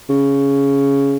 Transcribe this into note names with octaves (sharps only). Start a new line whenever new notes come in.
C#3